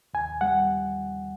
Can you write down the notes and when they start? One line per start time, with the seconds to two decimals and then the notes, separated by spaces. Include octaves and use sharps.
0.14 D#2 G#5
0.41 G3 F#5